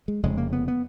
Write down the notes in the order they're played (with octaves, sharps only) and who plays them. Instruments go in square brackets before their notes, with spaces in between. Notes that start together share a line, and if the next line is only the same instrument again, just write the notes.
[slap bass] G#3
F1 F2 C#3 G#3
A#3
B3
B3